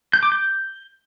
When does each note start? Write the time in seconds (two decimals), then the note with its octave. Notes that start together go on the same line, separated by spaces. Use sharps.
0.13 G6
0.23 D6
0.32 G6